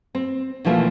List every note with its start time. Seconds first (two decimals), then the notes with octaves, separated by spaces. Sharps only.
0.15 C4
0.65 B2 E3 F3 A3 A#3